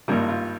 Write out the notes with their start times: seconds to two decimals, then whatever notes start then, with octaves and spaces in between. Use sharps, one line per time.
0.08 G#1 G2 G3 A#3 F4
0.29 F4